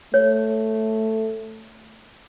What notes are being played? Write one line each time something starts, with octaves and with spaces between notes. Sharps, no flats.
A3 C#5